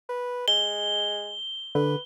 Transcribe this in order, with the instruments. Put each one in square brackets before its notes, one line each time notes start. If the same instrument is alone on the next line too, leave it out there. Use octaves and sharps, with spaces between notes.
[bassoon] B4
[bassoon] G#3 [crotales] G7
[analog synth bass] D3 [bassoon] B4